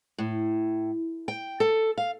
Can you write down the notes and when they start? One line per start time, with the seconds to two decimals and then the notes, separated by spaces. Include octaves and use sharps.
0.18 A2
1.28 G5
1.60 A4
1.98 F5